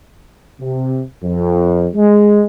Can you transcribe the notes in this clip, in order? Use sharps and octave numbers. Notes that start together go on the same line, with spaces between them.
C3
F2
G#3